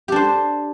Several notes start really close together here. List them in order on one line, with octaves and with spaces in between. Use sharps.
G4 D4 C5